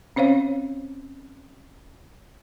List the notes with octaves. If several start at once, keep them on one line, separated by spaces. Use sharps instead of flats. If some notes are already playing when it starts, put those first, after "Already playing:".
C4 C#4 C5 C#5 F5